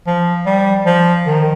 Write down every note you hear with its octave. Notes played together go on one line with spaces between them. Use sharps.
F3
G3
F3
D#3